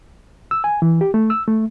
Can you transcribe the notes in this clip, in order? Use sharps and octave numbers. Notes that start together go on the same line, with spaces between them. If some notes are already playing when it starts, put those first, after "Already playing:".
E6
G#5
E3
G4
A3
E6
A3